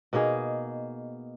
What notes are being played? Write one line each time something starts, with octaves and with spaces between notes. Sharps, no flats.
B2 A#3 D#4 G#4